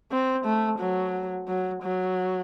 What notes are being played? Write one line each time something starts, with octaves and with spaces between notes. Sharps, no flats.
C4
A3
F#3
F#3
F#3